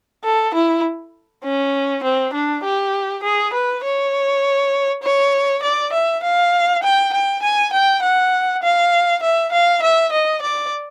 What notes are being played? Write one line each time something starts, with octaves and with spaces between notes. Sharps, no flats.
A4
E4
C#4
C4
D4
G4
G#4
B4
C#5
C#5
D5
E5
F5
G5
G5
G#5
G5
F#5
F5
E5
F5
E5
D#5
D5